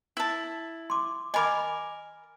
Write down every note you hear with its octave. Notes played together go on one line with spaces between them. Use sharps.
E4 A5
C6 D6
A#4 D#5 G#5 B5 D6